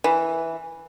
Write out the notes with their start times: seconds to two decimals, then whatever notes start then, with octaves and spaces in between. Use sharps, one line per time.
0.04 E3